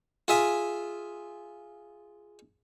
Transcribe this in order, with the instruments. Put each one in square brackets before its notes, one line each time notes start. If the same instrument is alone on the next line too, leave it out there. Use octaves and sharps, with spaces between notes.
[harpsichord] F4 G#4 E5 G#5